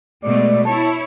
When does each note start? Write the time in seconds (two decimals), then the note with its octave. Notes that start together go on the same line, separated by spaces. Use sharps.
0.22 B2 G#3 A3 D5
0.65 E4 C#5 A5